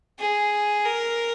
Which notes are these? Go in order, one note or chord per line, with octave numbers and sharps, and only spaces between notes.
G#4
A#4